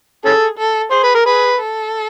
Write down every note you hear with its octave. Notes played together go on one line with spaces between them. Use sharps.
C#4 G#4 A4
A4
G#4 C5
B4
A#4
G#4 B4
A4